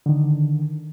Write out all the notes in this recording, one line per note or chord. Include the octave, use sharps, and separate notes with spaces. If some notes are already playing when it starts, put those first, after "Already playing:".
D3 D#3